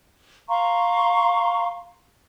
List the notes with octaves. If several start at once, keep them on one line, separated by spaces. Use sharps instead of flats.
F5 A#5 C6 C#6